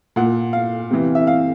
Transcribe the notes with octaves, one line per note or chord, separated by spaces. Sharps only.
A#2 F#5
F5
C3 E3
E5
F5